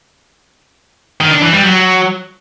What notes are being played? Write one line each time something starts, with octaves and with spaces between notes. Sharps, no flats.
D#3
D4
E3
G3
F#3